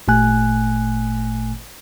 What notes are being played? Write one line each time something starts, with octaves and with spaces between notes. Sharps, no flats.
G#1 A#2 A3 G#5 F#6